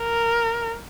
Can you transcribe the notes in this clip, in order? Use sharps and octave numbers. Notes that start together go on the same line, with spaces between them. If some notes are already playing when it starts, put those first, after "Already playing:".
Already playing: A#4